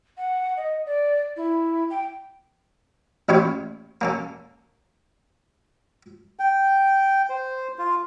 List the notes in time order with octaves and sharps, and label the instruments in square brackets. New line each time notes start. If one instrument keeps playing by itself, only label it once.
[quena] F#5
D#5
D5
E4
G5
[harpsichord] A1 A#2 E4 G4 C#5 F5
A#3 C#4 A4
[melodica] G5
C5
F4